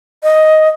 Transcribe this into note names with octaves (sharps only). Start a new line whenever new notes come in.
D#5